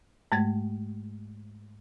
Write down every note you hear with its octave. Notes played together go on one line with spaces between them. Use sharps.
G#2 G#3 A3 G#6